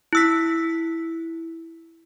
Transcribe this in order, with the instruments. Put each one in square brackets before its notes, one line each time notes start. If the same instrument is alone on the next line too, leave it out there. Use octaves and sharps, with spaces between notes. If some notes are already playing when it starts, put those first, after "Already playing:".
[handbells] E4 E6 B6